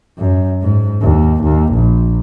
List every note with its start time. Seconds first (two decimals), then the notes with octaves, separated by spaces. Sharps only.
0.18 F#2
0.62 G#2
1.02 D#2
1.44 D#2
1.74 A#1